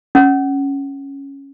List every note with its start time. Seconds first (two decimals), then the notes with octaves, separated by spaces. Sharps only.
0.15 C#4